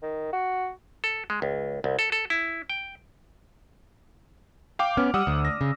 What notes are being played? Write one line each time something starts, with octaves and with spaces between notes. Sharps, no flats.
D#3
F#4
A4
G#3
C#2
C2
A4
A4
E4
G5
F5 G5 D6
B3 C#4 F6
G3 F#5 D#6 E6
D2
A#6
C#3